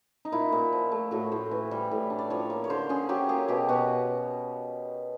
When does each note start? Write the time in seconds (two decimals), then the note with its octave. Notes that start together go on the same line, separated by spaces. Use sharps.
0.25 D#4
0.32 A#2 E4
0.52 A#2
0.73 F3
0.92 A3
1.11 A2 F#4
1.32 A2 C5
1.51 E3
1.71 G3
1.91 A2
2.10 D4
2.19 D5
2.30 F3 C#5
2.50 A#3
2.64 C#5
2.70 D3 C5
2.89 C#4 G#4
3.09 F#3 G4
3.29 A#3 G#4
3.48 B2 G4
3.69 B2 F#4